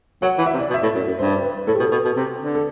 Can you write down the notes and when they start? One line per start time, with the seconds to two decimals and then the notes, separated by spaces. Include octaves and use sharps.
0.22 F#3 F#5
0.38 E3
0.46 E5
0.54 C3
0.60 D5
0.70 B2
0.74 E5
0.83 A2
0.95 F#2
1.07 F#2
1.19 G2 C5
1.43 B4
1.67 A2 A4
1.75 G4
1.79 B2
1.82 A4
1.91 B2
2.05 B2
2.16 C3
2.40 D3
2.55 A4